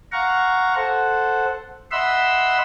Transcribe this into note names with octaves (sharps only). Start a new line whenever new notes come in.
F5 F#5 A#5 C#6
A4 C5 F#5
D#5 E5 F#5 B5 C6 E6